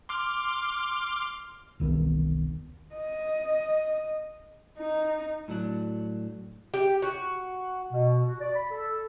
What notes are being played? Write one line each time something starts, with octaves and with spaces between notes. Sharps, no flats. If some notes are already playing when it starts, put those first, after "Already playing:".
C6 D6 F6
E1 C2 D#3 B3
D#5
D#4
A2 F#3 D4
G4
F#4
B2
F#4
D5
B5
A4